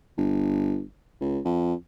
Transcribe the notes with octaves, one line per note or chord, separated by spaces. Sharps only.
G1
C#2
F2